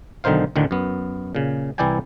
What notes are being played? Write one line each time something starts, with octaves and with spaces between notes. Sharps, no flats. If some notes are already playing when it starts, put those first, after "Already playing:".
B1 D3 D#3 D#4 C5 F5
D2 A2 D3 D#3
F#2 B3
A#2 C#3
C2 E3 E4 D5 G5 G#5